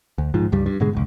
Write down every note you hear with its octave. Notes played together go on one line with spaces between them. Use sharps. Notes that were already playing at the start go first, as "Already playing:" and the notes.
D2
A#1 G#2 F3
C#2 G2 G3
G2
G#2 B2 D3 G#3
F1 C#2